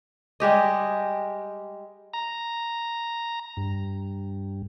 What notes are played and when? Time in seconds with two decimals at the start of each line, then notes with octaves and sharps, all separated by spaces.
0.40 G3 G#3 G4 D#5
2.14 A#5
3.57 G2